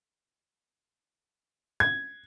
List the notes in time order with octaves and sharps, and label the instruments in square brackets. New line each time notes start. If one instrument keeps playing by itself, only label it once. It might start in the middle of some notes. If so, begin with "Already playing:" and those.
[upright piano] G#6